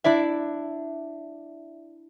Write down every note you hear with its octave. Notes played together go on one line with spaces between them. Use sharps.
D4 E4 D5 E5